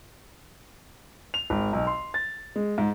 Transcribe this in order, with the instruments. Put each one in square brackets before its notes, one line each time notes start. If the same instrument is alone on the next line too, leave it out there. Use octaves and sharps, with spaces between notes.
[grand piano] F7
G#1
B1
C6
A6
G#3
G#2